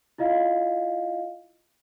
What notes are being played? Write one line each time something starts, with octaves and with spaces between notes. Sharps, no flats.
E4 F4 D#5 F5